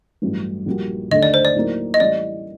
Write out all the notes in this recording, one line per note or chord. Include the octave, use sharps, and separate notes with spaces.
A1 G2 F#3 A3
A#1 A#2 G3 A#3 F#4
D#2 D3 A3 D4 A4 D#5
D5
C5
D5
A2 F#3 A#3 D#4
D#5
A1 A2 G3 D5